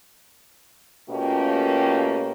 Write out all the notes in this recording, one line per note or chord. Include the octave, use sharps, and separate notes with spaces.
B2 A3 A#3 C#4 F4 G4